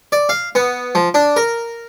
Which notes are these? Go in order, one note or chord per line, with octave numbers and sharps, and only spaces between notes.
D5
F5
B3
F3
D4
A#4